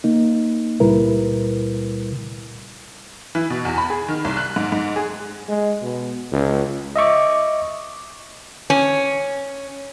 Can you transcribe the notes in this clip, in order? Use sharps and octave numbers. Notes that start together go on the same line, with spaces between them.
A#3 D#4
C#2 A#2 G3 E4 A#4 B4
E3
B2
E2
B5
G#4
D#3
C2
F#6
G#2
G#2
G#4
G#3
B2
C#2
D#5 E5 C#6 D6
C#4